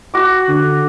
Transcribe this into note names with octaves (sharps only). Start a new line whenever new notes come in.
F#4 D6
D3